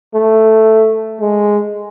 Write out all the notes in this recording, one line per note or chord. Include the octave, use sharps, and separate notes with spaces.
A3
G#3